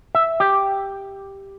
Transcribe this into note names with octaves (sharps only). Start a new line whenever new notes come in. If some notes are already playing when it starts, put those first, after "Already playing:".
E5
G4